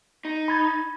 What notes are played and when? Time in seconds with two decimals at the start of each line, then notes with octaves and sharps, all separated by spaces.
0.25 D#4
0.48 B5 G#6 A6